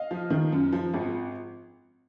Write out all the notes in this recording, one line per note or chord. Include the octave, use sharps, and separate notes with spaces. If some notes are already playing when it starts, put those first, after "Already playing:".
Already playing: D#5 F5
F3
D#3
F#2
F3
G#1